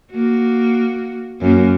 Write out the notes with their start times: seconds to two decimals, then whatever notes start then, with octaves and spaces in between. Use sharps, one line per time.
0.11 A#3 F#4
1.41 F#2 A#3